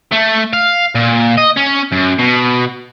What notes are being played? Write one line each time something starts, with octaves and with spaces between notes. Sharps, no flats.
A3
F5
A#2
D#5
C#4
F#2
B2